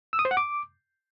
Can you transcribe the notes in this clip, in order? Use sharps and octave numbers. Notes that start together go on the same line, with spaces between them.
E6
D#6
C5
F#5
D6